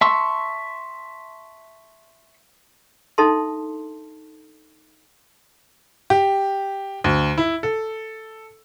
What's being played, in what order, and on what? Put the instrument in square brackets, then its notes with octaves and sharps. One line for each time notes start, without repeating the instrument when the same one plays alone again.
[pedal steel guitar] E5 A5 C6 C#6 E6
[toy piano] D4 D#4 A4 E5 A5 C6
[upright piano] G4
D2
E4
A4